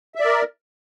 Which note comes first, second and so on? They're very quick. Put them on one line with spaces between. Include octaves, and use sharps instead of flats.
E5 D5 A#4